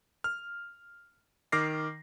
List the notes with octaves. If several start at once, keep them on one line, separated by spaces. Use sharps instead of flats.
F6
D#3 D6 F6 A#6 C7